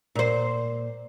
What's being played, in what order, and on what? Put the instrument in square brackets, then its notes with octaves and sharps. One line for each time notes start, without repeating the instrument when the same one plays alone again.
[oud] A#2 C5